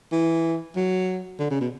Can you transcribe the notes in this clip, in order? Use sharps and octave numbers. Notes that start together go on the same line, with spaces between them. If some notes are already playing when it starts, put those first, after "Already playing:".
E3
F#3
D3
C#3
B2